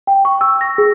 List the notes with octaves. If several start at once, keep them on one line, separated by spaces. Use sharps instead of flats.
G5
C#6
E6
A#6
G#4